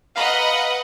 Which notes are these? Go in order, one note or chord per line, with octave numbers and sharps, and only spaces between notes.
B4 D#5 F5 F#5 A#5 B5